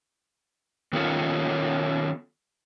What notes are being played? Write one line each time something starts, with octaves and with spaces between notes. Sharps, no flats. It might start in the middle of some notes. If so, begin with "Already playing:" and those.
D#3 B3 C#4 F4 A4 C#5